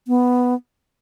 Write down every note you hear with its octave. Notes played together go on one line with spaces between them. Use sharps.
B3